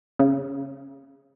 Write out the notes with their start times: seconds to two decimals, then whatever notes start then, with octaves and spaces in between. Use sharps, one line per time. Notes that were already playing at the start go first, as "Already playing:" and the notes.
0.19 C#3